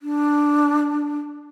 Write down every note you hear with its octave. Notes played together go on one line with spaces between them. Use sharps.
D4